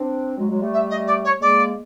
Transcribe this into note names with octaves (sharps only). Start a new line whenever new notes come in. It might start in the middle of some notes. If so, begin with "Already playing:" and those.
Already playing: C4 D4
F#3 G#3
F#3 G#3
G3 A3
E5
D#5
D5
C#5
G#3 A#3 D5